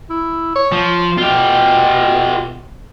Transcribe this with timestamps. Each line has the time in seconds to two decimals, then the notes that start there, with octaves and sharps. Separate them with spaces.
0.10 E4
0.56 C#5
0.72 F3
1.17 B2 F4 G4